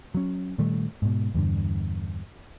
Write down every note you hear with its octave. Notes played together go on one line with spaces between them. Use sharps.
F#3 C#4
A#2 D#3 G3 A3
G#2 B2
E2 G2 D3